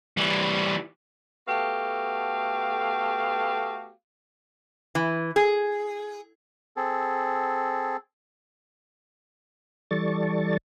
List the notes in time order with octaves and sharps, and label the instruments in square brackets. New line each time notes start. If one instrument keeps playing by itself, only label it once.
[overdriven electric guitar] E3 G3
[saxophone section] A3 B3 F#4 G4 A4 F5
[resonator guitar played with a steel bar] E3
G#4
[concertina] C4 G#4 A4
[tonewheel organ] E3 G3 A4 D5 C#6 A6